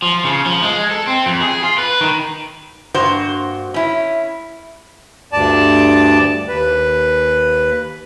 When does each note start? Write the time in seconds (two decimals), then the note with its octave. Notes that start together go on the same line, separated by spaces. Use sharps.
0.02 F3
0.25 C#3
0.46 F3
0.62 G#3
0.91 A4
1.07 C4
1.26 F2
1.42 G#4
1.64 F4
1.78 B4
2.01 D#3
2.94 G2 A#3 F#4 C5
3.74 C#4 E4
5.32 D2 G2 D5 A5
6.49 D#2 B4